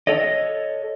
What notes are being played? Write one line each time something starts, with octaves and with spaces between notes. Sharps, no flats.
A4 C#5 D#5